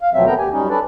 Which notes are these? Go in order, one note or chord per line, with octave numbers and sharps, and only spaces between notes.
F5
D2 B2 F3 F#3 C4 E5
B3 A4 A#4 G5 A#5
D2 G4 G#5
F#2 G3 C#4 D#4
C#4 D4 A4 B4 D5